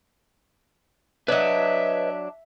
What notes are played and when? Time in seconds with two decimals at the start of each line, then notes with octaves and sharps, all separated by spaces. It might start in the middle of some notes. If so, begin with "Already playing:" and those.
1.28 F#3 D4 B4 C#5 D#5 E5